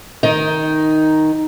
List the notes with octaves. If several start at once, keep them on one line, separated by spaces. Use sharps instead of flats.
D#3 D#4